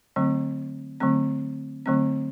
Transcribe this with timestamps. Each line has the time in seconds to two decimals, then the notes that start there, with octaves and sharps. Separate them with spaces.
0.16 D3 F#3 A3 C4
1.00 D3 F#3 A3 C4
1.86 D3 F#3 A3 C4